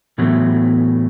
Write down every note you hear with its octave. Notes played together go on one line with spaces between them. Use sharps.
A2 E3 F#3 A3 B3